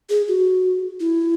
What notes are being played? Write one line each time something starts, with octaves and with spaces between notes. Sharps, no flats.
G#4
F#4
E4